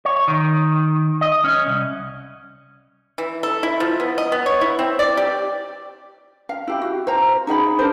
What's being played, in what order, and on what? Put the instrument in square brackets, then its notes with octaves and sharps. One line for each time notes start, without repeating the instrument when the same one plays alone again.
[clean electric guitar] C#5
D#3
D#5
C#4
C2
[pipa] E3
A4
E4
F3
B3
D#5
B3
C#5
E4
C4
D5
G4
[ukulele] F5
E4 G4
F#4
C5 F5 A#5
D#4 G#4 F5 B5
D4 A#4 C5